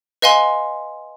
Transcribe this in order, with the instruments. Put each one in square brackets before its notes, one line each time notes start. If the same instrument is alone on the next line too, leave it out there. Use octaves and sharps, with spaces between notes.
[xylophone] B4 D#5 F5 G#5 C6